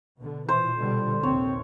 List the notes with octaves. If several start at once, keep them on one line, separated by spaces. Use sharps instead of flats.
B2 D3
A#2 E3 C5
B2 D3 G3
A#1 D#2 C3 C4 C#5